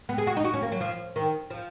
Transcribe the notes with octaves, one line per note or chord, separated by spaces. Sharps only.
B3
G#4
F#4
D#4
F#4
C#4
A#3
F#3
F3
D#3
F3